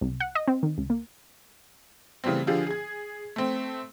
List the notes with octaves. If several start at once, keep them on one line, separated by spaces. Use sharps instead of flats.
C2
F#5
D#5
C4
D#3
C#2
A#3
C#3 E3 G3 A3 C4
D3 F3 G4 G#4
G#4 G#6
A3 C4